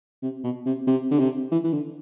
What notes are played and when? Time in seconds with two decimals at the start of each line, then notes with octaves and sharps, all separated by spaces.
0.22 C3
0.44 B2
0.66 C3
0.87 C3
1.11 D3
1.19 C3
1.51 E3
1.64 E3
1.73 D3